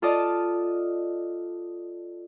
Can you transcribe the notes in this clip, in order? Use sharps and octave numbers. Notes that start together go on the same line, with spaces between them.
F4 A4 D5 D#5 F5 A5